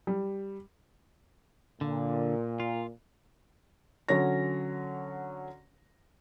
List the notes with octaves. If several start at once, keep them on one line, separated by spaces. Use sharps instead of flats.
G3
A#2 D3
F4
D3 F#3 C#4 C#5 A#6